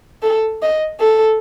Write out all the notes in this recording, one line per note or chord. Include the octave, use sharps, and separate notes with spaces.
A4
D#5
A4